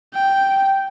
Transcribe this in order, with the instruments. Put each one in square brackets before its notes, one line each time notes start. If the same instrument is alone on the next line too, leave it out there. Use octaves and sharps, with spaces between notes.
[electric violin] G5